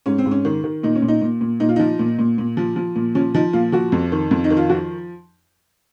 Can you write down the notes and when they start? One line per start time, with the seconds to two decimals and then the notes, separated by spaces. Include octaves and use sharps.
0.06 G#2 C#4
0.18 C4
0.26 G#2
0.31 C#4
0.45 D#3
0.64 D#3
0.83 A#2 D#4
0.95 C#4
1.02 A#2
1.08 D#4
1.22 A#2
1.41 A#2
1.60 A#2 D#4
1.69 F4
1.76 F3 D#4
1.99 A#2
2.19 A#2
2.38 A#2
2.57 F3
2.76 F3
2.96 A#2
3.15 F3 C#4
3.35 F3 D#4
3.53 A#2 F4
3.72 F3 F#4
3.92 F2
4.12 D#3
4.31 F2
4.44 D#4
4.50 D#3
4.57 F4
4.69 F3 F#4